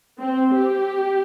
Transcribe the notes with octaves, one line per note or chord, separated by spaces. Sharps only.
C4
G4